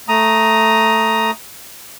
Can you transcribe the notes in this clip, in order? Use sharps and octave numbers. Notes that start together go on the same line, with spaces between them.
A3 A#5 D#6